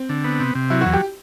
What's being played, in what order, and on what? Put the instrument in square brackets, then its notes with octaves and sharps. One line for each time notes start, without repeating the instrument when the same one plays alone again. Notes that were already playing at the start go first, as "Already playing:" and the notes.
Already playing: [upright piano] C4
[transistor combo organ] D3
B3
C3
C3
[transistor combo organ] F#3 [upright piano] E4
[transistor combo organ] E2 [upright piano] F#4
[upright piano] G4